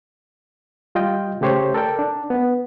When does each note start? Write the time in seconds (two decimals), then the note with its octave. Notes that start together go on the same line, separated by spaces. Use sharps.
0.95 G3 F4 D#5 G5
1.41 C#3 A3 G4 C5 C#5
1.74 A4 A#4 D5 G5
1.99 D4
2.30 B3